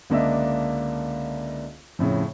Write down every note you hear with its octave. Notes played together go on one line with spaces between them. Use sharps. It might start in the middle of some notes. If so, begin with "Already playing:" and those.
C#2 D3 A#3 D4 D#5 E5
F2 A2 C#3